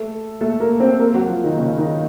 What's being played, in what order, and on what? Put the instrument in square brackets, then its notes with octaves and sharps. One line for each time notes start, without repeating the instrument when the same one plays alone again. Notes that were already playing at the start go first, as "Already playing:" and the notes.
Already playing: [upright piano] A3 A4
A3 A4
A#3 A#4
C4 C5
A#3 A#4
F#3 F#4
F3 F4
D#3 D#4
C#3 C#4
D#3 D#4